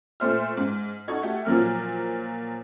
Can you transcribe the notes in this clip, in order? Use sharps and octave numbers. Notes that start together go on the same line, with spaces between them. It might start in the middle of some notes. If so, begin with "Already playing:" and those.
A#2 A3 C5 E5 F6
G#2
D#4 F#4 A4 C#6 G#6
A3 F#4 G4 A4 E5
A#2 F3 F#3 A#3 F6